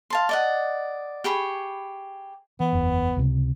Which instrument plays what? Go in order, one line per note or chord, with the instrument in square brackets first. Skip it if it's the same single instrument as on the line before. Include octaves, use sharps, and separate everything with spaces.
[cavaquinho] F5 A5 C6
D5 D#5 F#5
G4 G#4 B5 C#6
[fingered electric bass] E3 [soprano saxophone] B3
[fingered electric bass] F#1 E2
C#2 C3